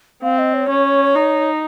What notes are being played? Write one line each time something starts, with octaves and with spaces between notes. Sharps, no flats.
C4 F5
D#5
C#5
C#4
D#4